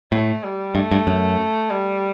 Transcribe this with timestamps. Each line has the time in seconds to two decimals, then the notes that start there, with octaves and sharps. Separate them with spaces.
0.12 A2 A3
0.44 G3
0.75 G2 A3
0.91 G2
1.07 F#2
1.70 G3